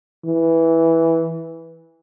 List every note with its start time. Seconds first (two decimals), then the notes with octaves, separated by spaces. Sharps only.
0.25 E3